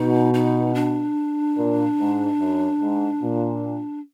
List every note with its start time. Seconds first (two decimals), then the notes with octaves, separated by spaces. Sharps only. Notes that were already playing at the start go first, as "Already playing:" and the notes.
Already playing: B2 D#4
0.34 D#4
0.75 D4
1.57 A#2
1.99 G#2
2.39 F#2
2.80 G#2
3.22 A#2